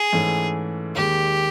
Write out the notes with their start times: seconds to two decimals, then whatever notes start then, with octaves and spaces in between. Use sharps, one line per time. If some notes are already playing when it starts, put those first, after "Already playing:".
Already playing: G#4
0.13 G#2 E3 A3 C#4
0.95 D#2 D#3 G#3 G4